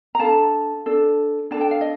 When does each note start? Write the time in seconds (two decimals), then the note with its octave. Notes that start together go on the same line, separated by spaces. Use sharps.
0.15 A#5
0.19 D4 A4 F5 A5
0.86 D4 A4
1.51 D4 A4 A5
1.61 G5
1.71 F5
1.81 D#5